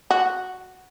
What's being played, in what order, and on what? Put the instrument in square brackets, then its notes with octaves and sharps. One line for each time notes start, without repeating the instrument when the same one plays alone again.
[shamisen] F#4